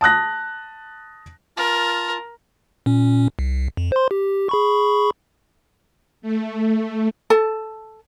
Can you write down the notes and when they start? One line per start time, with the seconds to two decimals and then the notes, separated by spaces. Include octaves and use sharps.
0.01 A5 D#6 F#6 A#6
1.57 F4 A#4 A5
2.86 A#2 C#4
3.39 C2
3.77 F2
3.92 C5 C6
4.11 G4
4.49 G#4 B5 C#6
6.22 A3
7.30 A4 A5